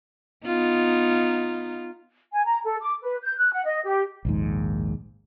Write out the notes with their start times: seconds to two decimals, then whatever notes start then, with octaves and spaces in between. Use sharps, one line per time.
0.46 B3 D#4 F4
2.32 G#5
2.45 A#5
2.64 A4
2.82 D6
3.03 B4
3.23 G6
3.38 F#6
3.53 F#5
3.66 D#5
3.84 G4
4.25 A#1 D#2 G#2